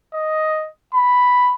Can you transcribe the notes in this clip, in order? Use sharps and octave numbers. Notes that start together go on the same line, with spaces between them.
D#5
B5